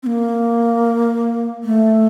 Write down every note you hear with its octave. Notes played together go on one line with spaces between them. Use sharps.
C4
A#3
A3